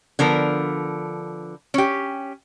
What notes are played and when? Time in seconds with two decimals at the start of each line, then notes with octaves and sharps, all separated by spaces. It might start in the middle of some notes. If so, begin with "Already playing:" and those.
0.19 D3 F3 B3 A#4
1.74 C#4 G4